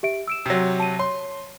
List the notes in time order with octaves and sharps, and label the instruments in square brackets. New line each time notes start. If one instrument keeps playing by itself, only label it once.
[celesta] G4 E5 D7
E6 D7 E7
[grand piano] C3 F#3
[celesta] A5 D#7
[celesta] C#5 [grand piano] C6